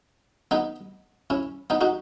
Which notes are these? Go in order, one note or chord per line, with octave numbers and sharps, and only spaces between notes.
B3 D#4
C#4 E4
B3 D#4
D#4 F#4